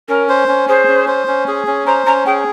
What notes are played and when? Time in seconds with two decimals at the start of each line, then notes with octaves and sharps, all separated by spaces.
0.09 C#4 A#4
0.29 C5
0.48 C#4
0.68 G#4 C5
0.88 C#4
1.08 C5
1.28 C#4
1.48 G#4
1.67 C#4
1.87 C5 A#5
2.06 C#4 A#5
2.26 G#4 G5